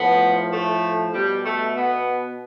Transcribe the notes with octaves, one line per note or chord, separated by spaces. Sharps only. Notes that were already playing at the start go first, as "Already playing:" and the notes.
Already playing: A2 F3 B3
A3
B2 G3
A3
B3